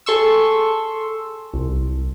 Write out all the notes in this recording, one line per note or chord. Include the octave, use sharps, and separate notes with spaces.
G#4 A4 C6 C#6 E6
C2